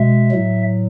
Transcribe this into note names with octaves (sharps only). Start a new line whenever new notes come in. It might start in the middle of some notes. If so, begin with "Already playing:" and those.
Already playing: B2 G#3 E5
A2 F#3